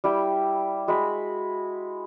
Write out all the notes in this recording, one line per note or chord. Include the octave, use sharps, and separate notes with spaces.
G3 E4 G5
G#3 F#4 B5